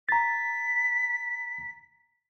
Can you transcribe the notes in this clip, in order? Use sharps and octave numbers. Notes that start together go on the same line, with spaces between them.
A#5 A6 B6